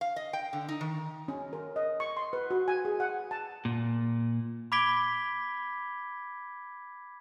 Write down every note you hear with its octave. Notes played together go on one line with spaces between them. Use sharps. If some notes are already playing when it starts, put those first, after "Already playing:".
F5
D#5
G5
D3
D#4
D#3
C#4
A#4
D#5
C#6
C6
B4
F#4
G#5
G#4
F#5
A5
A#2
B5 D6 G#6 B6 D7 G7